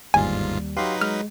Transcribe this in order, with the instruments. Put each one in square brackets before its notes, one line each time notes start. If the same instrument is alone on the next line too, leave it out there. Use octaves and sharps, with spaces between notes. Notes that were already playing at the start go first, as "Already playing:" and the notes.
[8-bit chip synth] G1 G#2 F4 [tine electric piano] D#2 G3 [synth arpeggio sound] G#5
[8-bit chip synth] F#3 D#4 B4 [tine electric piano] G4 F5 C6
[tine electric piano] G#3 [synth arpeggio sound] F6